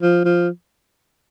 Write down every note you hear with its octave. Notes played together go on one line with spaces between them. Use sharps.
F3
F3